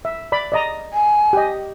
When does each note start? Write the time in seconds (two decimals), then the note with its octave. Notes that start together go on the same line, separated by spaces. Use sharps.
0.05 E5
0.32 D5 B5
0.52 D5 D#5 A#5
0.93 G#5
1.33 G4 D#5